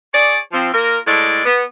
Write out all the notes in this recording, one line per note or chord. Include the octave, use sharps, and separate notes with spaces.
G#4 C#5 D5
F3 C4
A#3 F4 A#4
A2 G#3 A4 D5
B3